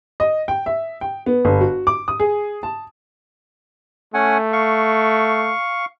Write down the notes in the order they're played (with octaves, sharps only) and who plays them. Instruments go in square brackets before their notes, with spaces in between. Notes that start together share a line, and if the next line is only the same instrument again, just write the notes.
[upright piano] D#5
G5
E5
G5
B3
G1
F#4
D6
D#6
G#4
A5
[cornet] A3 [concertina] C#4 F#5 G#5
[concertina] F5 C#6